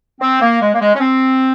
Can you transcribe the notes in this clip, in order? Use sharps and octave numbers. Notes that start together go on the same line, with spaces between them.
C4
A#3
G#3
A#3
G#3
C#4
C4